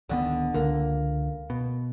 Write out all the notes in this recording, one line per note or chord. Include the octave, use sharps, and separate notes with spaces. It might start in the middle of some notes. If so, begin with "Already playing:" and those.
D1 D3 D#3 B3
C#2 D3 A#3
B2